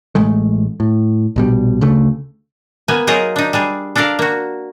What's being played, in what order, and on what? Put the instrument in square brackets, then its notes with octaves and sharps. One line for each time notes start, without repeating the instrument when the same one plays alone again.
[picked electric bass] A1 G#3 A3
A2
A#1 B2 G3
D2 C#3 A3
[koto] A#3 B3 G#5
F#3 D#4 F4 G#4 A#4 D#5
D4 D#4
G3 D4 G#4
D4 A4 A#4 D5 F5
A#3 F#4